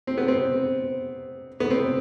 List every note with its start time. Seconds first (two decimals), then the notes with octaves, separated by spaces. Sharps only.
0.07 C4
0.18 B3
0.28 C4
1.60 B3
1.70 C4